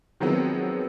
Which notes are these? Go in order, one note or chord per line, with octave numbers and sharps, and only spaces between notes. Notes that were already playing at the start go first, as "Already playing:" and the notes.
D#3 F3 F#3 G#3 B3 C4